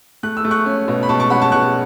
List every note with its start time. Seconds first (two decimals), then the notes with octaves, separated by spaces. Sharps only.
0.23 A3 F#6
0.37 E6
0.45 A3
0.51 C#6 F#6
0.66 C#4
0.88 B2
1.03 B5
1.09 B2 A5 C#6
1.20 A5 C#6
1.30 C#4 F#5 B5
1.41 A5 C#6
1.52 B2 C#6 F#6